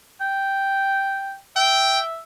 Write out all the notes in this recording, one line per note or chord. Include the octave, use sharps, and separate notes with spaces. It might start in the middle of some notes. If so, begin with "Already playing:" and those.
G5
E5 G5